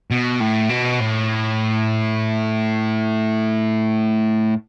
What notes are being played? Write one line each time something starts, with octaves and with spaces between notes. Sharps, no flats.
B2
A2
B2
A2